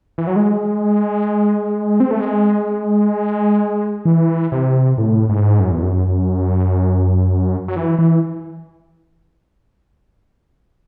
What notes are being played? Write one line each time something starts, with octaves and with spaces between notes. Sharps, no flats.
E3
F#3
G#3
C4
A3
G#3
E3
C3
A2
G#2
F#2
E2
F#2
F#3
E3
E3